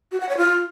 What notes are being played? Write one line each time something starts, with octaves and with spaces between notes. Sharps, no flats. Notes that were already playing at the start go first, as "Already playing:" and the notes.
F#4
F#5
C#5
F4